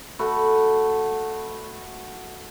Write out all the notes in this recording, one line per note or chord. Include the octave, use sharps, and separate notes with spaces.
A3 F#4 B4